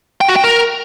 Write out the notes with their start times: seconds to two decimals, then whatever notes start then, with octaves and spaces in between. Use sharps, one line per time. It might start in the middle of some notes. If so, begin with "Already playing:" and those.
0.21 G5
0.29 F#4
0.36 G5
0.44 A#4